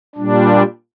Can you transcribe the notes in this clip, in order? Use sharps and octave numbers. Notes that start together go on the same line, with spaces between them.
A#2 G3 D4